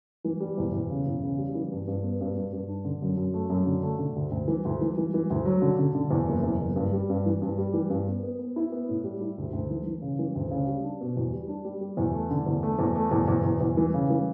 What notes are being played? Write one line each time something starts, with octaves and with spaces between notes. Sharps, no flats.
E3
G3
E2
E2
C#3
E2
C#3
G3
E3
G2
G2
B3
G2
G2
G2
D4
D3
F#2
F#2
A3
F#2
D3
A3
D3
D2
D2
E3
D2
E3
E3
E3
D2
F#3
D3
D3
D3
E2
F#1
E2
F#1
G2
G3
G2
E3
G2
G3
E3
G2
B3
B3
B3
E4
B3
A2
G3
E4
D2
D2
E3
E3
C#3
E3
D2
C#3
G3
D4
B2
E2
G3
D4
G3
G3
E2
A3
D3
E2
A3
E2
A3
E2
E2
E2
E2
E3
C#3
E3